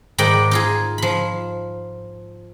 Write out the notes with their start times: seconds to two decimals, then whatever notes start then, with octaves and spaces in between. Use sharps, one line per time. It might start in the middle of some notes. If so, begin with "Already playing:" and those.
0.18 G#2 D#3 D5 G5 B5
0.51 D#4 F4 G#4
0.98 F3 B5